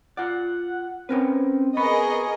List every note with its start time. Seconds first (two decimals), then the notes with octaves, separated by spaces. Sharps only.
0.17 F4 D5 F#5
1.09 C4 C#4 A#4 B4
1.77 B3 G#4 A#4 D#5 B5 C#6